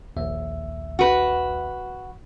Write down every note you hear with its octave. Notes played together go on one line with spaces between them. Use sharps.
A#1 D#2 E5
F#4 B4